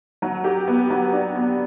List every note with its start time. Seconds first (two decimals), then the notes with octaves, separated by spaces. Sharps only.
0.22 F#3
0.44 G4
0.67 B3
0.90 F#3
1.12 D4
1.35 B3